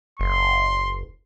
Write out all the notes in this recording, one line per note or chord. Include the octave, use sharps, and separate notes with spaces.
F#1 C6